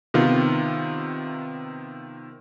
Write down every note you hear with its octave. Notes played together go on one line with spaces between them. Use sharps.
C3 D#3 B3 F4